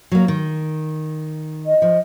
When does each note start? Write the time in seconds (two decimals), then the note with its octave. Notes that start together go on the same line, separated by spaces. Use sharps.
0.11 F#3 A#3
0.28 D#3
1.66 D#5
1.82 F3